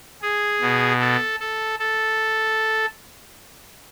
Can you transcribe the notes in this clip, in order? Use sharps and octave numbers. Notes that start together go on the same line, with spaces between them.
G#4
B2
A4
A4
A4